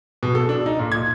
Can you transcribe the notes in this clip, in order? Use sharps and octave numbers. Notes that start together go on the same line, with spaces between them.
B2
A4
D4
D#4
A#2
G#6